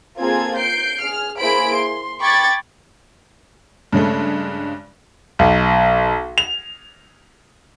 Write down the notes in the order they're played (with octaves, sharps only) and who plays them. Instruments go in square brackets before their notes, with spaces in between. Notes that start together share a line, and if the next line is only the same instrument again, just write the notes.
[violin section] A#3 C4 F4 G#4 A4 G#6
G6 C7 D7
G#4 F6
A#3 E4 G#4 C5 B5 D7
C6
G5 B5 C#6 D6 G#6 A6
[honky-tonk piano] G2 C#3 G#3 A3
[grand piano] B1
F7